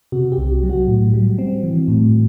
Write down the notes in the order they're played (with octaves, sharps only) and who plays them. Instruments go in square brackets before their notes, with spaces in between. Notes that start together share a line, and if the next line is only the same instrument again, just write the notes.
[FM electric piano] C3 F#4
G4
C2
F#3
F#4
A2
G3
C4
E3
A2